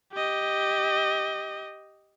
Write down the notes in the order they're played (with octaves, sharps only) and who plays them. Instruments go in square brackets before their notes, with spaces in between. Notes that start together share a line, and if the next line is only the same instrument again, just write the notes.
[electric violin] G4 D#5